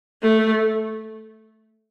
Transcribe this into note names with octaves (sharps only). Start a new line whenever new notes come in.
A3